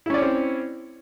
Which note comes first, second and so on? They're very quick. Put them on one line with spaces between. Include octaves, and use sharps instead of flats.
E4 C#4 D5 C#5 C4